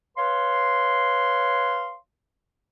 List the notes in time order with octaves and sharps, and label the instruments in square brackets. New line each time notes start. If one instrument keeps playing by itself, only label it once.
[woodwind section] B4 C#5 F5 C6